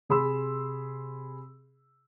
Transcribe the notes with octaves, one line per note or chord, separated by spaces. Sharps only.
C3 G#4 B5 C6 E6